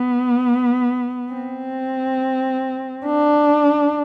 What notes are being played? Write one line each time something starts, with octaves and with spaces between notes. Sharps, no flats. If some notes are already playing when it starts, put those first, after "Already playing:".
Already playing: B3
C4
D4